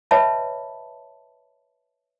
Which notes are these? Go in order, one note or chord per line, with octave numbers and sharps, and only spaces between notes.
B4 C#5 D#5 E5 A5 B5